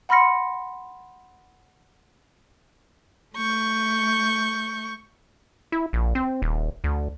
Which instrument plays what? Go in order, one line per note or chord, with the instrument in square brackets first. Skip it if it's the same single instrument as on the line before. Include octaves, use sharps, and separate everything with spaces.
[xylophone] F#5 B5 C6 F6 A#6 C#7
[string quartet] A3 C#6 G6
[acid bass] E4
A#1
C4
D#1
D2